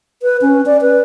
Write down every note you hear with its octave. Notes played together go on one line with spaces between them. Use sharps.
B4
C#4
D5
B4